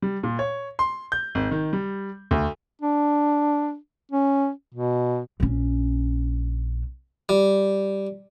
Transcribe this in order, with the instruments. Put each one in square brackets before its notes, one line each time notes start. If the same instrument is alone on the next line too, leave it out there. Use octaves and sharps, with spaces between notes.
[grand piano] G3
A#2
C#5
C6
G6
G#1
D#3
G3
D2
[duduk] D4
C#4
B2
[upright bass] A#1 C#4
[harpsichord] G3